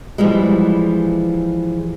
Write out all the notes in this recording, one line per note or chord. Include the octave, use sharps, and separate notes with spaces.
E3 F3 G3 G#3